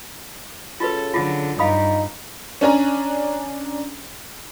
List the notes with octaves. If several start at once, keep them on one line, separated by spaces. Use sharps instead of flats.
C#3 F4 F#4 A4 B4
D3 F#3 F4
G2 D#4 F5 B5 D#6
C#4 D4 G#5 A#5